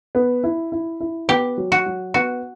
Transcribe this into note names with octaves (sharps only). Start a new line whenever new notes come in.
B3
E4
E4
E4
B3 G4
F#3
F#4
F#3
B3 F#4